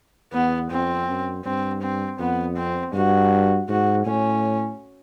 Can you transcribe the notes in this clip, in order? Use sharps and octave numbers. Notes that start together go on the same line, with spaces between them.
E2 B3
F2 C4
F#2
G2 C4
C4
F2 B3
C4
G2 F#4
G#2 F#4
A2 C#4